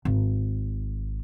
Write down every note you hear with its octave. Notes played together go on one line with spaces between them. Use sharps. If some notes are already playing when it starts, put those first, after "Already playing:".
G#1